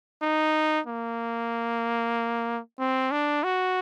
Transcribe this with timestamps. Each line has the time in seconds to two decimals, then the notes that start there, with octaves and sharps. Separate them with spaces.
0.22 D#4
0.87 A#3
2.79 C4
3.11 D4
3.44 F#4